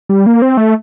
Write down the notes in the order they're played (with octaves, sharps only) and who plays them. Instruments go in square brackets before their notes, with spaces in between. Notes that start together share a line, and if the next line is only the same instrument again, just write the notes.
[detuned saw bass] G3
A#3
C4
A3